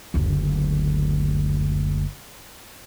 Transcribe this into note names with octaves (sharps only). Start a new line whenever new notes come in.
F#1 D2